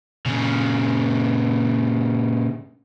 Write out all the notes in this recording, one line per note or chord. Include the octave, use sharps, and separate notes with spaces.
A#2 C#3